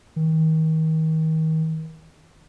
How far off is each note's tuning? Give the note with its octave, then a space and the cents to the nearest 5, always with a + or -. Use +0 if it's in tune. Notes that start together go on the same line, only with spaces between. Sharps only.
D#3 +35